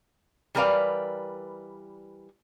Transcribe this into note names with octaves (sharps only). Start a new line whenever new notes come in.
E3 G3 A#4 B4 D5 F5